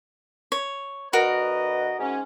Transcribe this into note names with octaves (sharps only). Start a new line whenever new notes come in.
C#5
D2 F#4 A#4 B4 D#5
G#2 C#4